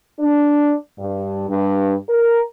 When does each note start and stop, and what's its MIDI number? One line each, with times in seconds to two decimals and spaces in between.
0.19 0.74 62
0.98 1.46 43
1.48 1.93 43
2.09 2.40 70